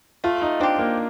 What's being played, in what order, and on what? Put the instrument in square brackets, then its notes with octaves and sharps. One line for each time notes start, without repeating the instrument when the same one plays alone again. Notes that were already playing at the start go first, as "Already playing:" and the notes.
[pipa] A3 [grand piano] F4
[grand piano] D#4
[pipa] C4 G4 [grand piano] D4
[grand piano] A#3